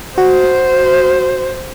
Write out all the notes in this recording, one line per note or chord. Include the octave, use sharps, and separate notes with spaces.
F#4 C5